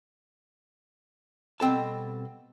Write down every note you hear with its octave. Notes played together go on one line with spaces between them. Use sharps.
B2 G3 C4 A4 A5